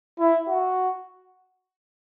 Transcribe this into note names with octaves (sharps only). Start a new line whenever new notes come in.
E4
F#4